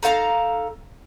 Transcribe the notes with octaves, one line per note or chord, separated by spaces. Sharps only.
D#4 A4 F5 A#5